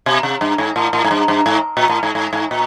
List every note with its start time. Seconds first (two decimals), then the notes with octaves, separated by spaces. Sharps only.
0.06 B2
0.23 C3
0.41 G2
0.58 G#2
0.76 A2
0.93 A2
1.04 G#2
1.11 G2
1.28 G2
1.46 G#2
1.77 A#2
1.89 A2
2.03 G#2
2.15 G#2
2.33 G#2
2.51 A#2